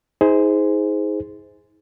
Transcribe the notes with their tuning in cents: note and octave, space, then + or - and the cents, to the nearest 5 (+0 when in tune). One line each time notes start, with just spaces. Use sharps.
D#4 +40 G#4 +0 C5 -15